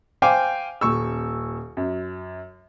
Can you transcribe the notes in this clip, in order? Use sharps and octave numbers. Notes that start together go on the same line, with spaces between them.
C5 F5 G5 G#5 D6
D#1 C#6 E6
F#2